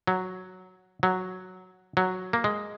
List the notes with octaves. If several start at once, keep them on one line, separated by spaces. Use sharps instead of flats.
F#3
F#3
F#3
A#3
G#3